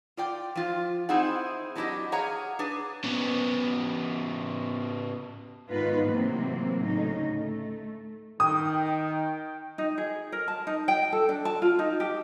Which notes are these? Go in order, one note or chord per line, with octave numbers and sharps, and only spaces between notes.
F4 D5 G5
F3 F4
C4 D#4 E4 G#4 F#5
F#3 D4 E4 F#4 G4 D#5
G#4 C#5 F5 F#5 A#5
D4 G#4 B4
C#3 B3
G#2 D#3 B3 D#4 F4 B4
A2 C3 E3 F#3 A#3 C4
D2 A2 C#3 D#4
A3
D#3 G5 D#6
D#4
G#4
A#4
A5
D#4
G5
A4
D4
A5
F4
D#4
G4